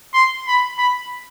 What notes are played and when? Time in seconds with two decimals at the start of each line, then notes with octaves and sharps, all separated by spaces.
0.14 C6
0.47 B5
0.78 B5